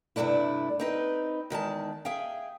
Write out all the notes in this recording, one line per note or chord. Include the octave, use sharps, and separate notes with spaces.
G2 C3 A3 D4 E4
C4 D#4 B4
E2 D#3 G#3 A5
G#4 E5 F5 G5